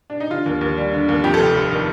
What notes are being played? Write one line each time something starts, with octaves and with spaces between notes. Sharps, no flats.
D4
D#4
D3 F4
D#2
D#2
G3
D3
D#2
F2 G4
A4
F1 G4
F1
D#3